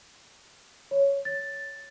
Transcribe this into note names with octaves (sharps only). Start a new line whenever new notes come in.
C#5
A6